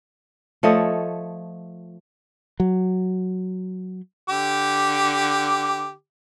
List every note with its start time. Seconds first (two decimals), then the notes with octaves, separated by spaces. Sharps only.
0.63 F3 A3 C#5 D#5
2.60 F#3
4.29 D3 G4 D6